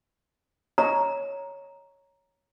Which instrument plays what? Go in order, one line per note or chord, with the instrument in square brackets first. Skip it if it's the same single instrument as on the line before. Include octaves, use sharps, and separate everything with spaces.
[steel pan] C#5 D#5 [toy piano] A#5